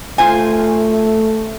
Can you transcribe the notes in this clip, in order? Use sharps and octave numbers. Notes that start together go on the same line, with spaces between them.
A3 F4 C5 G#5